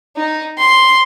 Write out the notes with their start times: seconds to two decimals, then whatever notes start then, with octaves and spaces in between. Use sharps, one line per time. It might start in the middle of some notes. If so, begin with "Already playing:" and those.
0.16 D#4
0.58 C6